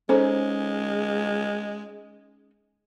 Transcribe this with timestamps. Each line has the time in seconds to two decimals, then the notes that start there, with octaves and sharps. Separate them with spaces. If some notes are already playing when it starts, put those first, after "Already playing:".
0.09 G#3 C#4 D#4 A4 C5